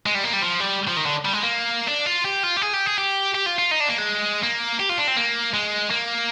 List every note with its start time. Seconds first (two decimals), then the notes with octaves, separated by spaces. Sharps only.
0.06 G#3
0.15 G3
0.24 A#3
0.33 G3
0.42 F3
0.60 G3
0.87 F3
0.97 D#3
1.06 D3
1.25 G3
1.33 G#3
1.43 A#3
1.88 D4
2.06 F4
2.25 G4
2.43 F4
2.56 G4
2.62 G#4
2.73 G4
2.86 G#4
2.98 G4
3.35 G4
3.46 F4
3.59 F4
3.71 D#4
3.80 D4
3.88 A#3
3.98 G#3
4.43 A#3
4.80 G4
4.90 F4
4.98 D4
5.08 C4
5.16 A#3
5.54 G#3
5.90 A#3